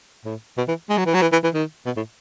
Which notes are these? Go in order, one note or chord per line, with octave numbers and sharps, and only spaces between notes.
A2
B2
E3
G#3
F#3
E3
F#3
E3
E3
E3
D#3
B2
A2